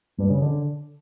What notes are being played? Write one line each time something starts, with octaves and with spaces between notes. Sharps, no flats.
G2
C#3
D3